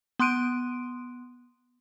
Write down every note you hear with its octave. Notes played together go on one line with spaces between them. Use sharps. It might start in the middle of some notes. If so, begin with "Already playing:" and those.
B3 C6 F#6 D7 D#7